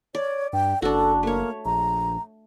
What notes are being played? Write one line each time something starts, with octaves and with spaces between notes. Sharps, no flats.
C#5 D5
G2 G5
F#1 D4 F#4 A4
A3 A#3 C#5
A#1 A#5